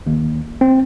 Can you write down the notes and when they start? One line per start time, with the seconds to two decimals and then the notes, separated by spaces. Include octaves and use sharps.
0.07 D#2
0.61 C4